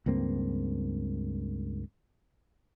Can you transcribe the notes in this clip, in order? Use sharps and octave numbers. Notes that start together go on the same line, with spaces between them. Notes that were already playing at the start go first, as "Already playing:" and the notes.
C#2 G2 A#3 C4